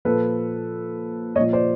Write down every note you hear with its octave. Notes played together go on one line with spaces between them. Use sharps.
A#2 F3 A4 B4
A#2 F3 C#5 D#5
C5 D5